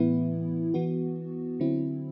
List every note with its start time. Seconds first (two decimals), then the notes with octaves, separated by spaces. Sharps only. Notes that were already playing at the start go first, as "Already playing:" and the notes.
Already playing: A2 E3 B3 E4
0.74 E3 B3 F#4
1.60 D3 F#3 C4 E4